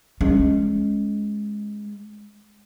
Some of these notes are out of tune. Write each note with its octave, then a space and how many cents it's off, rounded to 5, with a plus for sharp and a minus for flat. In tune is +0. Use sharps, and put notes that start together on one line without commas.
G#3 +5 C#4 -5